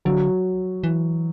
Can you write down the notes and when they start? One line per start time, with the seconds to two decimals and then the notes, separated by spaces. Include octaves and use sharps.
0.05 D3 F#3
0.84 E3